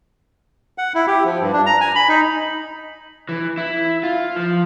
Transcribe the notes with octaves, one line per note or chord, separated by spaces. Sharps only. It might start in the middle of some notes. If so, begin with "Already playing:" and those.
F#5
E4
G4
F3
G2
D4
A#5
G#5
B5
D#4
E3
E4
F4
F3